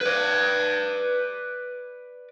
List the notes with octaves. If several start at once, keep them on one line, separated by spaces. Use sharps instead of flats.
B4 D5